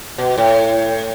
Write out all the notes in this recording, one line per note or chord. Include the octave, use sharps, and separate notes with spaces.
B2
A2